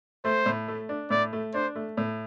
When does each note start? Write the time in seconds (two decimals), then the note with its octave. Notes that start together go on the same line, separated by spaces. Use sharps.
0.24 A3 C5
0.46 A2
0.68 A3
0.89 D4
1.10 A2 D5
1.33 A3
1.54 D4 C5
1.76 A3
1.97 A2